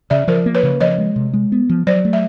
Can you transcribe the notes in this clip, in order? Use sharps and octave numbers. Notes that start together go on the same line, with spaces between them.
C#3 D5 E5
F3 A#4 C5
A#3
B4 C#5
C#3
F3 C#5 D#5
G#3
C3
G#3
B3
F3
F#3 C5 D5
A3
E5